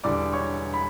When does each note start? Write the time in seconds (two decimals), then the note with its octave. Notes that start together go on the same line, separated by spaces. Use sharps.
0.04 E1 E2 D3 G3 D5 D6
0.33 C#5 C#6
0.74 B5